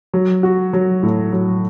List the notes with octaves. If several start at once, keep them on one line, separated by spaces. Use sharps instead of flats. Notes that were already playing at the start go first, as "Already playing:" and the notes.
F#3
F#4
F#3
A2
F#3